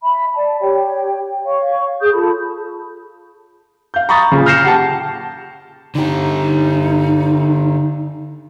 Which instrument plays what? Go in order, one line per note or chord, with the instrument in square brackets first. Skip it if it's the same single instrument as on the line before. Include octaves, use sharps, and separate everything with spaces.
[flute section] E5 B5
D5 A5
G4 C#5 G5
C#5 F5 C#6
G#4 D#6 G6
F4 A4 A5 B5
[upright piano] F5 G6
A#5 B5 C#6 D#6 A6
A#2 C#3
F6 G6 A#6 C7 C#7 E7
G4 F#5 G5 A5
[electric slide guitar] D3 G4 [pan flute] D#4